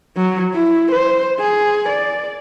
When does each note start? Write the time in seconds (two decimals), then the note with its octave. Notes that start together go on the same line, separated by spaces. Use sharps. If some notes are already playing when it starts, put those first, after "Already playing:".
0.17 F#3
0.54 E4
0.92 C5
1.40 G#4
1.89 D5